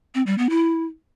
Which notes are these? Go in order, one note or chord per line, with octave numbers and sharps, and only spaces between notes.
C4
G3
B3
E4